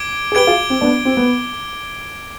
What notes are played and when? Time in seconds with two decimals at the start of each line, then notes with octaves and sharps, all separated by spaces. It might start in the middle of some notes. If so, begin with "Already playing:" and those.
Already playing: D6 G#6 D7 G7
0.32 G#4
0.35 G4 B4 G#6 D7 G7
0.47 F4 G#4
0.70 C4
0.81 B3 D4
1.05 C4
1.17 B3